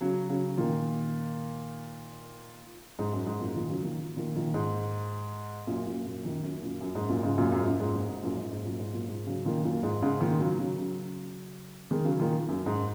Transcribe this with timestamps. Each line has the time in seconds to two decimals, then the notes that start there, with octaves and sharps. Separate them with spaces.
0.01 C#3 F#3
0.29 C#3 F#3
0.58 A#2 D#3
2.99 G#2
3.13 F#2
3.26 G#2
3.40 F#2 A#2
3.55 A#2 D#3
3.69 C#3 F#3
3.83 A#2 D#3
4.17 A#2 D#3
4.36 A#2 D#3
4.54 G#2
5.67 F#2 A#2
5.87 F#2 A#2
6.05 F#2 A#2
6.25 A#2 D#3
6.43 F#2
6.62 F#2 A#2
6.81 F#2
6.95 G#2
7.09 F#2 A#2
7.23 G#2 C#3
7.38 F#2 A#2
7.52 F#2
7.61 G#2
7.66 F#2 A#2
7.80 G#2
7.95 G#2
8.09 G#2
8.23 F#2 A#2
8.37 G#2
8.51 G#2
8.65 F#2 A#2
8.79 G#2
8.93 F#2 A#2
9.08 G#2
9.26 C#3 F#3
9.45 A#2 D#3
9.64 F#2 A#2
9.83 G#2
10.02 G#2 C#3
10.21 A#2 D#3
10.39 C#3 F#3
10.59 C#3 F#3
10.78 C#3 F#3
11.91 D#3 G#3
12.05 C#3 F#3
12.20 A#2 D#3
12.48 F#2
12.66 G#2